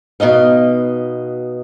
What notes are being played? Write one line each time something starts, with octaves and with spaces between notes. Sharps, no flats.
B2 D#4 D#5 F5